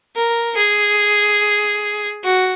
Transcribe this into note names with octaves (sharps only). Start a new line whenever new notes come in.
A#4
G#4
F#4